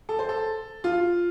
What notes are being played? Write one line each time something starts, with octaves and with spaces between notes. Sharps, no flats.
A4
C5
A4
F4